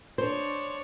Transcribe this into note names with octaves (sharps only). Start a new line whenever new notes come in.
D4 C5 C#5